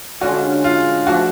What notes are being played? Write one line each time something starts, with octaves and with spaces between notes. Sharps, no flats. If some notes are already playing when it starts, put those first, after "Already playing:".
D3 G#3 C#4 F4 F#4
F4
F3 A3 D4 F#4